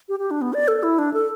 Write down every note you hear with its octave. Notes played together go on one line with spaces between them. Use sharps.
G4
G4
D4
B3
D5
A4
E4
D4
A4